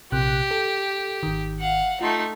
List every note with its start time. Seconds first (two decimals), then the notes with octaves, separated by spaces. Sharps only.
0.12 A#1 C3 G4 F#6
0.51 A4
1.23 G#1 D#3
1.59 F5 F#5
2.01 A3 D#4 F4 C6 C7